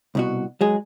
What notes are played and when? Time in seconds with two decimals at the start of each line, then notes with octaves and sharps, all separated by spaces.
0.15 C2 B2 F#4
0.61 F#3 G#3 G#4